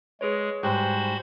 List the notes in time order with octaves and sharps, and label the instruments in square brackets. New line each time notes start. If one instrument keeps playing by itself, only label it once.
[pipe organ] G#3 [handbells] G#4 B4 C#5
[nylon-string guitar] G#2 [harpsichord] G3 [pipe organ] F#4 C5 B5 [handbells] C6 F#6